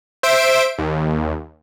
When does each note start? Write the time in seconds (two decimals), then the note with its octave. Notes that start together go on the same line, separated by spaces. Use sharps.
0.23 C5 E5 D7
0.78 D#2